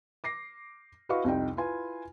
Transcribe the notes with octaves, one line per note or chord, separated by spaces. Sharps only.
D6 A#6 C7
E4 F#4 B4 D#5 F5 C#6
C2 F2 D#4 G5
E4 F4 B4 G#5